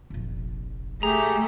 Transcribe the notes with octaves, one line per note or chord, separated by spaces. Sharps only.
F1 A#1
A3 G4 G#4 A#5